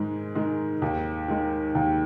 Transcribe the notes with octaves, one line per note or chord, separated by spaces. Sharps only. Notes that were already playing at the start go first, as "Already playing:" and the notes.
Already playing: G#2 D#3 G#3
D#3 G#3
D#2
D#3 G#3
D#2